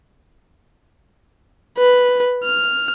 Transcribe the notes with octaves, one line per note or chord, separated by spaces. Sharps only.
B4
F6